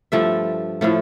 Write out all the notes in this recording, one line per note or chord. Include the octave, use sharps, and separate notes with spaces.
G2 F3 A3 E5
A2 F3 A3